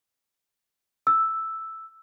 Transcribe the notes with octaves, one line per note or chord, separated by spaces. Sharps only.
E6